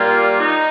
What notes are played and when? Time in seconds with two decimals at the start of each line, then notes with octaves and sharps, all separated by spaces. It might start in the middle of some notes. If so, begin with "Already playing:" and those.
Already playing: A#2 G3 A#3 F4
0.40 D#4